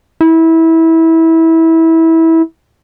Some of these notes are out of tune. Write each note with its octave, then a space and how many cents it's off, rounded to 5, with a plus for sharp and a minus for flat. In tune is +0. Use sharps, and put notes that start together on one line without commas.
E4 -20